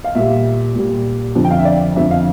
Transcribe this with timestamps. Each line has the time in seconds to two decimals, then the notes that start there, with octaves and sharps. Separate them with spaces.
0.04 F5
0.15 A#2 G3 E5
0.75 A#2 G3
1.35 F2 D3 F3
1.44 G5
1.51 F5
1.59 E5
1.65 D5
1.96 F2 D3 F3 E5
2.11 F5